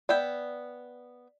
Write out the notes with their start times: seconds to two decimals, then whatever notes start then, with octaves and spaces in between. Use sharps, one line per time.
0.09 B3 D5 E5 G5